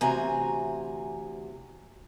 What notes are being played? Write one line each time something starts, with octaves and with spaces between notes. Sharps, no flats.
D2 C3 E3 G#5 A#5